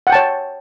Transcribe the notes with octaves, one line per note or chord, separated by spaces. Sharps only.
C#5 F#5 G5 A5